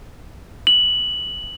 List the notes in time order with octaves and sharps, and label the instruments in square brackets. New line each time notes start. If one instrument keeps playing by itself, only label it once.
[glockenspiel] F#7